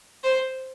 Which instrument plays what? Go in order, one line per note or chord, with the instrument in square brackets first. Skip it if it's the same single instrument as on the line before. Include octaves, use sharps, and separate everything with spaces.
[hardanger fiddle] C5